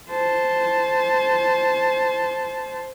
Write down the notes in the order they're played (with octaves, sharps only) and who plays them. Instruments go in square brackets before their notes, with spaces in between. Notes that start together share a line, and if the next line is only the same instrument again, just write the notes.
[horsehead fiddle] C5 A5